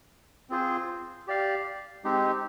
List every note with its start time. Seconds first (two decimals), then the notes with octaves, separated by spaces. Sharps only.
0.50 C4 F4 G#4 C5
1.27 G4 D5 F5
2.04 G#3 C4 D#4 G4